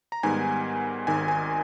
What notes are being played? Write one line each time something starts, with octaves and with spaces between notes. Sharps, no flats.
A#5
G#2 D#3 G3 B3 G#5
G#1 G#2 D#3 G#5
G#5